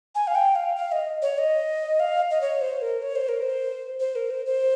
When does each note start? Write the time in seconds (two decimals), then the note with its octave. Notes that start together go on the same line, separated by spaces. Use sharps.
0.15 G#5
0.27 F5
0.35 G5
0.55 F5
0.76 F5
0.92 D#5
1.22 C#5
1.38 D#5
2.00 F5
2.31 D#5
2.41 C#5
2.61 C5
2.82 A#4
3.02 C#5
3.16 C5
3.29 A#4
3.42 C5
4.00 C5
4.16 A#4
4.30 C5
4.46 C5